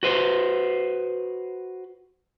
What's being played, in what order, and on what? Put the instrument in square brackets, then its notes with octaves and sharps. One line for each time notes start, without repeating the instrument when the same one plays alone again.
[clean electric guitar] F#4 B4 C5